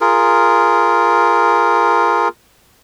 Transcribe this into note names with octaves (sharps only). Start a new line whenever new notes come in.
F4 G#4 A#4